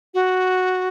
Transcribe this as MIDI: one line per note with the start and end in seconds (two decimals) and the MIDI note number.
0.14 0.89 66